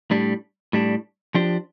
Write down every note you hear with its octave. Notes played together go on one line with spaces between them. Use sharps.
A2 G3 D4
A2 G3 D4
F3 D4 G4 C5